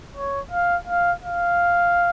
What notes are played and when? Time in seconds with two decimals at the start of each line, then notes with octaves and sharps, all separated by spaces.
0.15 C#5
0.51 F5
0.87 F5
1.23 F5